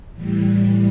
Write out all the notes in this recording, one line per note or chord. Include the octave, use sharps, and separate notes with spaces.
A2 E3 G3